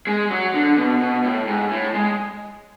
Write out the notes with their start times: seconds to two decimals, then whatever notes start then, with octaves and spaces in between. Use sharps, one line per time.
0.07 G#3
0.30 F#3
0.54 D3
0.77 B2
1.01 B2
1.24 A2
1.48 G#2
1.71 A2
1.94 G#3